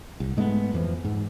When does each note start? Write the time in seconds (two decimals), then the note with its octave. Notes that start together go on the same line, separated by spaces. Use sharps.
0.20 C2
0.37 G#2 G#3 A3 B3
0.73 F2 E3 F3
1.05 G#2